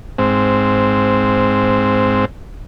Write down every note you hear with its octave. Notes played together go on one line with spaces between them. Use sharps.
G#2 C4